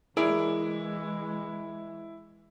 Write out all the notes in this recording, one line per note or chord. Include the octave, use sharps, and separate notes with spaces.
E3 G#3 E4 G#4 A#4 D5